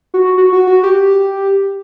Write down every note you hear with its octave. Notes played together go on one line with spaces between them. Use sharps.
F#4
F#4
F#4
F#4
G4